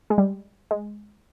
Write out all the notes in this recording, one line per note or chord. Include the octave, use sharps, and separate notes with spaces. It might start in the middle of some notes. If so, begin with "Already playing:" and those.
G#3
G3
G#3